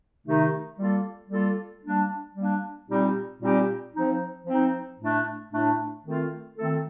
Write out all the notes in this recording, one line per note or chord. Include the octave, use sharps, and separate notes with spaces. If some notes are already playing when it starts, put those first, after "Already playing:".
C3 D#3 A3 D#4
G3 A#3 F4 A4
G3 A#3 F4 A4
G3 A#3 D4
G3 A#3 D4
A#2 G3 C4 D#4 G4
A#2 G3 C4 D#4 G4
F3 C4 D#4
F3 C4 D#4
A2 A3 D4
A2 A3 D4
D#3 A3 C4 F4 A4
D#3 A3 C4 F4 A4